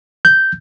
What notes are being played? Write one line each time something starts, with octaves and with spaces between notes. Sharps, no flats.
G6